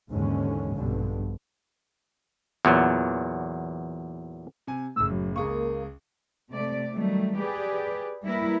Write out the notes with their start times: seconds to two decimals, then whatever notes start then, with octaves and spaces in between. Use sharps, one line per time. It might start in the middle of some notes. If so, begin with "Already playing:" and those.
0.11 D#2 G#2 D3 E3 G#3 C#4
0.74 A#1 G2 B2 D3
2.65 E2 A#2 F#3 B3
4.67 C3 G#5
4.96 F#1 A2 E6
5.11 F#3
5.36 C#2 A#3 G#4 C#6
6.51 C3 A3 D5
6.93 D#3 F#3 G3 A3
7.38 G4 G#4 B4 D5
8.24 G3 A#3 E4 A#4 B4